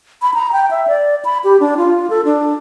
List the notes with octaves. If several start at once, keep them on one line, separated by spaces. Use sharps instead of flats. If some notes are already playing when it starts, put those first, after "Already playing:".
B5
A#5
G5
E5
D5
B5
G4
D4
F4
A4
D4